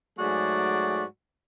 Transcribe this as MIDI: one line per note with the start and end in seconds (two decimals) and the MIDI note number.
0.19 1.04 44
0.19 1.04 54
0.19 1.04 57
0.19 1.04 66
0.19 1.04 68
0.19 1.04 74